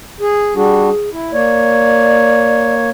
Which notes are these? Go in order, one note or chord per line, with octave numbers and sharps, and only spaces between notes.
G#4
G3 D4 F#4 G#4
E4
A#3 C#5 D5